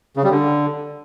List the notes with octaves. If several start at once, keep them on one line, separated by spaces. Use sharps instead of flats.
C#3
G3
D3